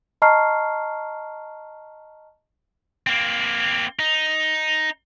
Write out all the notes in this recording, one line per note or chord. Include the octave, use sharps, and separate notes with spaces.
D#5 A5 A#5 C#6 F6 C7
A#3 C4
D#4